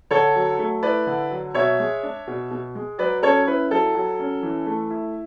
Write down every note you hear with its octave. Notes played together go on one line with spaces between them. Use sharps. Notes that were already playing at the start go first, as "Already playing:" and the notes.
D3 A4 C#5
F#3
A3
E4 B4 D5
D3
F#3
B2 C#5 E5
G#3
D4
B2
B2
G#3
F#3 B4 D5
C#4 A4 C#5
E4 B4
F#3 A4
F#3
C#4
E3
A3
E4